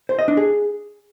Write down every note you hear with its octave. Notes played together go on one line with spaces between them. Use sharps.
C5
D#5
D4
G#4